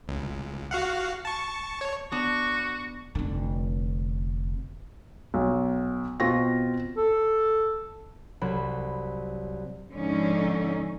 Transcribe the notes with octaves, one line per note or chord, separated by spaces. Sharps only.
C#2
F#4 F5 F#5
A5 C#6
C#5
B3 D4 F#4 C#6
F1 D3
B1
B2 C4 F4 C#6 A#6
A4
C2 F#3 B5
G#2 D3 F3 C#4 D#4